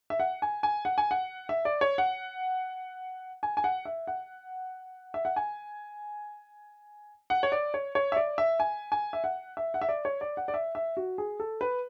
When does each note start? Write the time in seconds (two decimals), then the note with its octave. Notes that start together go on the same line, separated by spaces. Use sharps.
0.10 E5
0.20 F#5
0.42 G#5
0.63 G#5
0.85 F#5
0.98 G#5
1.11 F#5
1.49 E5
1.65 D5
1.81 C#5
1.98 F#5
3.43 G#5
3.57 G#5
3.64 F#5
3.85 E5
4.07 F#5
5.14 E5
5.25 F#5
5.36 G#5
7.30 F#5
7.43 C#5
7.52 D5
7.74 C#5
7.95 C#5
8.12 E5
8.16 D5
8.38 E5
8.60 G#5
8.92 G#5
9.13 E5
9.24 F#5
9.57 E5
9.74 F#5
9.82 E5
9.89 D5
10.05 C#5
10.21 D5
10.37 F#5
10.48 D5
10.54 E5
10.75 E5
10.97 F#4
11.18 G#4
11.40 A4
11.61 B4